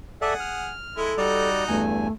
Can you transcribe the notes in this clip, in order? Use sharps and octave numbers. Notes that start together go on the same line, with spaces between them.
G#4 A4 D5 E5 F#5
F6
G#3 E4 A4
G3 D#4 F#4 D5
E2 G2 A3 G#5